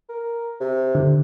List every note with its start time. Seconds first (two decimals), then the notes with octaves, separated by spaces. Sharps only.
0.09 A#4
0.60 C3
0.95 D3